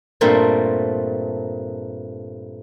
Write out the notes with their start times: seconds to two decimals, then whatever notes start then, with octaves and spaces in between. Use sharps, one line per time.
0.21 G2 A#2 A3 A#3 C4